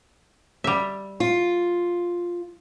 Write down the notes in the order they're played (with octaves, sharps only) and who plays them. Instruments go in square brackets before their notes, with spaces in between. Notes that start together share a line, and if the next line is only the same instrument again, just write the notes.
[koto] G3 E5
[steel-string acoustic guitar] F4